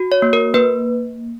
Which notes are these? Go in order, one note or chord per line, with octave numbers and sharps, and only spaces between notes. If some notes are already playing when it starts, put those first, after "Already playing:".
Already playing: F#4
C#5
A#3
A#4
A#3 B4